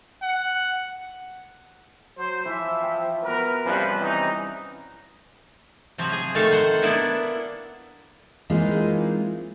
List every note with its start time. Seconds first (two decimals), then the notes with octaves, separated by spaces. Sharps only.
0.22 F#5
2.17 F#3 C5
2.46 E3 F3 E5
2.82 G5
3.23 B3 F#4 A#4 B4
3.65 C3 F3 G3 C#4 B4
4.00 E3 D#4
5.98 C3 F3 F#3
6.12 G#4
6.35 C3 D#3 A3 A4 C#5 F5
6.52 C5 F#5
6.82 A#3 B3 D4 E4
8.50 E3 G#3 A#3 C4 D#4 F4